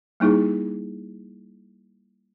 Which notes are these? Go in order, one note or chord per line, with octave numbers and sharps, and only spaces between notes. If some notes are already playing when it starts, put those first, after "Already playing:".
G3 A#3 D#4 E4 G#4